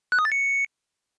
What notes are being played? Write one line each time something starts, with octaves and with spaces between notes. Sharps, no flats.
F#6
D#6
A6
C#7